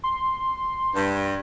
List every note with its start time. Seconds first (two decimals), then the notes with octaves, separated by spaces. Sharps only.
0.04 C6
0.95 G2